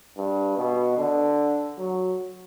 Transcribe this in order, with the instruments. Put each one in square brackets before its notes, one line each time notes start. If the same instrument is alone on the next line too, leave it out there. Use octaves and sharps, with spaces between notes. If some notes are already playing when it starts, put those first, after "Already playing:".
[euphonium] G2
B2
D3
F#3